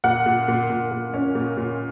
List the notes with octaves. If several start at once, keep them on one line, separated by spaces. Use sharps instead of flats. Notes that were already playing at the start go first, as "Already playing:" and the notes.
A#2 F#5
A#2
A#2
A#2
A#2
C#4
A#2
A#2